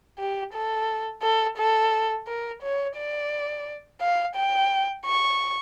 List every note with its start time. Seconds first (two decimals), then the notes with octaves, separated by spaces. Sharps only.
0.19 G4
0.54 A4
1.22 A4
1.57 A4
2.27 A#4
2.62 C#5
2.96 D5
4.01 F5
4.35 G5
5.05 C#6